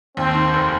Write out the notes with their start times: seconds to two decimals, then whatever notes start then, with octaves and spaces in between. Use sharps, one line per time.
0.17 D#2 C4
0.35 D#3
0.54 F1